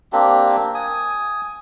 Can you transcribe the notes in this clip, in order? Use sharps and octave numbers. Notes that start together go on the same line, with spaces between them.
A#3 C4 D4 G4
G#5 D#6